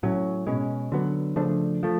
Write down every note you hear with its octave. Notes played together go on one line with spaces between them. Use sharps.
A2 F#3 C#4
B2 G#3 C#4
D3 F#3 B3
C#3 F3 A3 D4
F3 A3